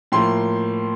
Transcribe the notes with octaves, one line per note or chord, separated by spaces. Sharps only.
A2 F3 A#3 C6